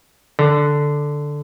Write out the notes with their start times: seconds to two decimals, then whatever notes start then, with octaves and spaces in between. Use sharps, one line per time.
0.39 D3